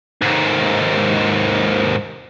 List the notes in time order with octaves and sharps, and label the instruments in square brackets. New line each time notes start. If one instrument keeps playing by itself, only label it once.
[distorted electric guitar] D#2 G#2